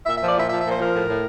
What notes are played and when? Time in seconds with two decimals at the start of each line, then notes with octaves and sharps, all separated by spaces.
0.06 A#2 E5
0.18 F3 E5
0.29 D5
0.35 A#2 E5
0.50 F3 E5
0.61 A#2 E5
0.72 C5
0.79 F3 A#4
0.94 A2
1.08 A2